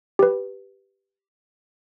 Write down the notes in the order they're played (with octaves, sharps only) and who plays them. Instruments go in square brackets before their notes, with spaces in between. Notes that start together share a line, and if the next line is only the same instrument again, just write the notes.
[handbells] G4 B4